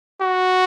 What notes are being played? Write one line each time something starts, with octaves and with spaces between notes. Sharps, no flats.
F#4